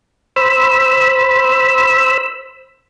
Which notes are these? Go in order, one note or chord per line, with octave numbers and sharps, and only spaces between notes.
C5 B5 E6